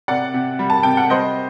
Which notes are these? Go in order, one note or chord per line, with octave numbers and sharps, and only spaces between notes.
C3 D5 F#5
C3
G3
A5
C3 G5
F#5
G3 C5 D#5